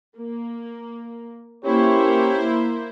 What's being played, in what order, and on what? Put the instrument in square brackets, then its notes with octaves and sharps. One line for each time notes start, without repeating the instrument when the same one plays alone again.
[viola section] A#3
[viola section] A#3 E4 C5 [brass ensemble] C#4 G4 C#5